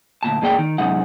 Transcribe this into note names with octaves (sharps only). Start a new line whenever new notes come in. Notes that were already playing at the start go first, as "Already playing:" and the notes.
D2 A#2 A5
G#2 A#3 G#4 D5 G5
D#3
F#2 C3 G#3 D#4 F#5